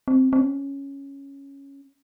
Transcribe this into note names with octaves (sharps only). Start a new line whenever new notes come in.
C4
C4
C#4